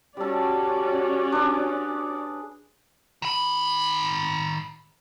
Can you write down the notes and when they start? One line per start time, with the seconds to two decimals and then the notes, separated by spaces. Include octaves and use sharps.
0.17 G3 C#4 F#4 A4 D5
1.32 D4 G#4 B4
3.22 D#3 B5